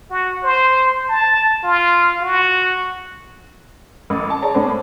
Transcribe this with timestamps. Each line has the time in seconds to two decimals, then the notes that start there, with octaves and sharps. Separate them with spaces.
0.11 F#4
0.44 C5
1.09 A5
1.64 F4
2.21 F#4
4.10 A1
4.30 A5
4.42 G#4 C#5 D5 A5 A#5
4.55 A2 D4 C5